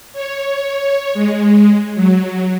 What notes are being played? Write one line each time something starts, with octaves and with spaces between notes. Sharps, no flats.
C#5
G#3
F#3